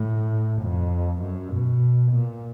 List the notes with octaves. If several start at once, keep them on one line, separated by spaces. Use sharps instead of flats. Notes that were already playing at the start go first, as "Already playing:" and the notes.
Already playing: A2
F2
F#2
B2
A#2